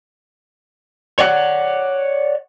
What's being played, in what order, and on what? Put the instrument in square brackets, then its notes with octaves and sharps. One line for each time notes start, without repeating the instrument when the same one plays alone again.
[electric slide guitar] C#5 D5 F#5